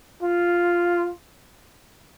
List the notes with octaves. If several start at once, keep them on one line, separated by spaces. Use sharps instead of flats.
F4